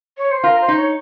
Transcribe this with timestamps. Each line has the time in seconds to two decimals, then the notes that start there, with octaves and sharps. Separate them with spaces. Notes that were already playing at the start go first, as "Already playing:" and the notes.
0.18 C#5
0.31 C5
0.43 F4 A#4
0.61 C5
0.68 D#4
0.76 C#5